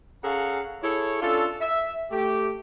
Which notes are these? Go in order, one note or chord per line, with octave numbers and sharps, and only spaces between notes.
C#4 G#4 A4 F5 F#5 A#5
E4 G#4 A4 C#5
C#4 D4 F4 A4
E5
A3 G4